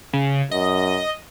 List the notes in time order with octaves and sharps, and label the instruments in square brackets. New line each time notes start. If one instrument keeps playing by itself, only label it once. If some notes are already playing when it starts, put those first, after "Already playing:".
[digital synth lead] C#3
[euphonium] F#2 [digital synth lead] D#5